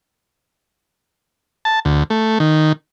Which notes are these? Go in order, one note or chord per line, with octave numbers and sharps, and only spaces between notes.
A5
D2
A3
D#3